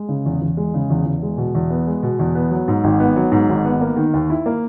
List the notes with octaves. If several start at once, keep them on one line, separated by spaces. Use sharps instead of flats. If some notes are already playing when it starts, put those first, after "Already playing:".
Already playing: G#3
C#3
E2
E2
G#3
C#3
E2
E2
G#3
B2
E2
B3
G#3
B2
E2
B3
F#3
G#2
G#1
B3
F#3
G#2
G#1
B3
A#3
D#3
D#2
E4
A#3